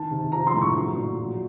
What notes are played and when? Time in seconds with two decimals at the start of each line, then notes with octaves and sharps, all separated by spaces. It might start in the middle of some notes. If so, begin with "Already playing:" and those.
Already playing: D#3 A5
0.11 C3
0.32 F3 A#5
0.47 C6
0.54 A2
0.61 C#6
0.76 F#3
0.97 A#2
1.19 F#3